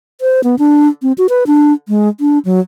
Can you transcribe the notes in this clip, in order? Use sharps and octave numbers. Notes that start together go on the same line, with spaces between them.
C5
B3
D4
C4
F#4
B4
D4
G#3
D4
F#3